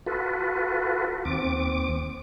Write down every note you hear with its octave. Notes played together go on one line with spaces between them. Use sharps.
F4 F#4 A4 B4
D#2 C4 D6